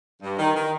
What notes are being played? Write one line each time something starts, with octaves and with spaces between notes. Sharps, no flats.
G2
D#3
D#3